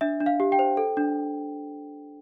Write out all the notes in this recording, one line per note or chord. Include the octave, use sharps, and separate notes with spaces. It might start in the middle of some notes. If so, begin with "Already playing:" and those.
D4 E5
D4
F5
G4
G5
C5
A4
D4